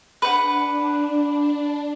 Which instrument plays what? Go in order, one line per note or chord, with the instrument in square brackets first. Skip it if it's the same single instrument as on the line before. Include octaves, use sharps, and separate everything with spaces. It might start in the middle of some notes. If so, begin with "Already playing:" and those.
[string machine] D4 [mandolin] B4 F#5